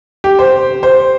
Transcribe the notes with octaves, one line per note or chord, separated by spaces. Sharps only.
G4
C5
C5